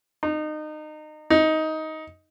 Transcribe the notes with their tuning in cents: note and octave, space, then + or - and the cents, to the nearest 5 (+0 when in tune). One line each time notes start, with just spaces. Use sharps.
D#4 -25
D#4 +15